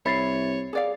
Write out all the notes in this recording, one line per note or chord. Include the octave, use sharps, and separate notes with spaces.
C2 C#5 E5 B5 A6 C7
G#4 D5 F5